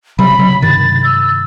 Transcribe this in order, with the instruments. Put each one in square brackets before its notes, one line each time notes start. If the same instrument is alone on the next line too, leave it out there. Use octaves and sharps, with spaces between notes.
[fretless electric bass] C3 F#3 G3 [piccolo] B5
[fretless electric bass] C#3 F#3
[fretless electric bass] G2 C3 D#3 [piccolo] A6
[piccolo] E6